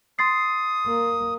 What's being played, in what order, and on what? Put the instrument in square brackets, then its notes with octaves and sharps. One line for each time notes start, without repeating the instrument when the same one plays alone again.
[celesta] C6 A6 C7 [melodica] D#6
[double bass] A#3